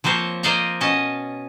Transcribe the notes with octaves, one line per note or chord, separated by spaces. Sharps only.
F3 A#3 C4 C5 C#5
A#3 C5 D5 D#5 F5 A#5
B2 C#4 D#5 A5